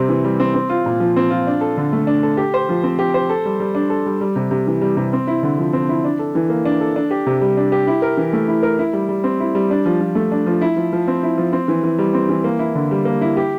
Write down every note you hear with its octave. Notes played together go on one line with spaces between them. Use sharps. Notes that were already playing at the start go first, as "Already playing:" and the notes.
Already playing: C3 G3 C4
E3
G3
C4
C4
F4
A#2
F3
C4
F4
D4
A4
D3
A3
D4
A4
G4
C5
F3
C4
G4
C5
A4
G3
G3
D4
A4
G3
G3
C3
C3
E3
G3
C3
C4
E4
D3
F3
C4
E4
D4
A4
E3
A#3
D4
A4
D4
G4
C3
G3
D4
G4
E4
A#4
E3
A3
E4
A#4
E4
G3
G3
C4
E4
G3
D4
F3
F3
A3
D4
F3
E4
F3
F3
C4
E4
F3
C4
E3
E3
G3
C4
E3
A#3
E4
D3
G3
A#3
E4
G4